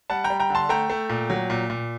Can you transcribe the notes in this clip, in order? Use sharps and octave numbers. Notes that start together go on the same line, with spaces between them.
G3 F#5 A5
G5 A#5
G3
G5 A#5
D3
A5 C6
A3 G5 A#5
A3
A#2
F#3
A#2
A#2